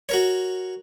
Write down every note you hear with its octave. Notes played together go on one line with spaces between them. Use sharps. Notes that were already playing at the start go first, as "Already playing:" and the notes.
F#4 A#4 C#5